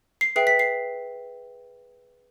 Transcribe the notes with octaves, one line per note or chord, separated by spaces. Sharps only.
C7
G#4 B4 E5 G5 C7
B6
C7